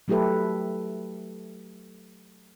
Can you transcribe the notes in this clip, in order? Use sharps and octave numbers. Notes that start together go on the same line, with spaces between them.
F#3 A3 E4 G4 A4 B4